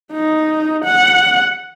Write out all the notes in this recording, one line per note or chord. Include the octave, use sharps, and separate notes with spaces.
D#4
F#5